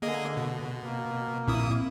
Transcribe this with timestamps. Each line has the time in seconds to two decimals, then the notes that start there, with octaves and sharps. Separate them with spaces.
0.02 D3 A#3 G#4 D#5
0.37 B2
0.78 A#3
1.47 A#1 A#2 C4 E4 D#6